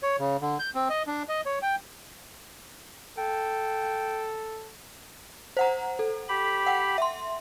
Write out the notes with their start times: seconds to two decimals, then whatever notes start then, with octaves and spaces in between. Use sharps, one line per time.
0.03 C#5
0.19 C#3
0.41 D3
0.59 G6
0.75 C4
0.89 D#5
1.07 D4
1.29 D#5
1.46 C#5
1.62 G5
3.18 A4 G5
5.57 C5 F#5 A#5
5.99 A4
6.29 G4 B5
6.66 F#5 G5
6.98 E5 C6